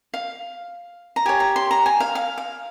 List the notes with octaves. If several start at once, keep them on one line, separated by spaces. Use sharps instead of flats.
F5
A#5
G4 C#5 G#5
A#5
C6
A#5
G#5
F5
F5
F5